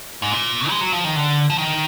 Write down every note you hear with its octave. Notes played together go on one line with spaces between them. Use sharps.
G#2
A#2
G#3
F#3
F3
D#3
D3
F3
D#3